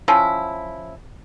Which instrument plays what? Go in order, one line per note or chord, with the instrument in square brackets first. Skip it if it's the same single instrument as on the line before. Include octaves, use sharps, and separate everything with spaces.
[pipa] F3 C#4 E4